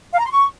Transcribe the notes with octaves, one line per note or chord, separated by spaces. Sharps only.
F5
A#5
C6
C#6